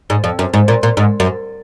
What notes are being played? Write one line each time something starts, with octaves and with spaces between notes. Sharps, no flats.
G#2
F2
F#2
G#2
A#2
A#2
G#2
F#2